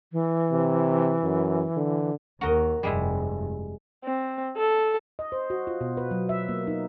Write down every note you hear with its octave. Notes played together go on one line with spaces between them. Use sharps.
E3
C3
F#2
D3
D#2 F#4 A#4 D#5
F1 G2 G3 G#3 E4
C4
A4
D#5
C5
F#4
F4
B2
B4
F#3
E5
A#3
D#4